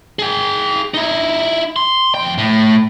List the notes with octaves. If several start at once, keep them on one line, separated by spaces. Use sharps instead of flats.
G#4 G5
D#4 E4
C6
F2 G5
A2